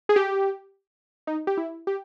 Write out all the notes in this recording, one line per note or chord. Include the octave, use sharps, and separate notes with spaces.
G#4
G4
D#4
G4
E4
G4